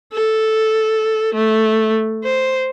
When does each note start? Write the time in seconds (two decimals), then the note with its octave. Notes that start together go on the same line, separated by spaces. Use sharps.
0.13 A4
1.34 A3
2.24 C5